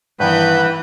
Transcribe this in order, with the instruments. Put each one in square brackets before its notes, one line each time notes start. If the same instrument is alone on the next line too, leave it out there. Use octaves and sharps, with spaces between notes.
[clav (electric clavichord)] G2 D#3 B3 [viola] E3 [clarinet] B4 [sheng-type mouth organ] F#5 B5 G6